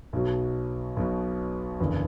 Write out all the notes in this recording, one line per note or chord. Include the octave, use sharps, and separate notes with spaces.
B1 B2 F#3
B1 B2 F#3
F#1 E2 D3